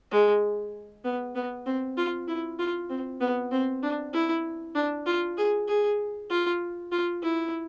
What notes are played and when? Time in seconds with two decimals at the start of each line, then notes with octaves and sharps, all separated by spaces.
0.11 G#3
1.04 B3
1.35 B3
1.66 C4
1.97 F4
2.28 E4
2.59 F4
2.90 C4
3.21 B3
3.52 C4
3.82 D4
4.13 E4
4.75 D4
5.06 F4
5.37 G#4
5.68 G#4
6.30 F4
6.92 F4
7.22 E4